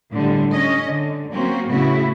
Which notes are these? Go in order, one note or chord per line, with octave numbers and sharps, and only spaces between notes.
A2 D3 G3 G#3
C#4 D#5
D3
F#3 A#3 C4 C#4 F#4
A2 C#3 B3 E4 F#4